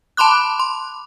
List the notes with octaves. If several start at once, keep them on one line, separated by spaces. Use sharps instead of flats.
A5 B5 C6 D6 F#6
C6